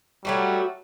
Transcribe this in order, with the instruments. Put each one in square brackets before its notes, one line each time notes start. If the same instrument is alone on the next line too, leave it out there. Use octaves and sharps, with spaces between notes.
[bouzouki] F#3 A3 F#4 [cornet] G3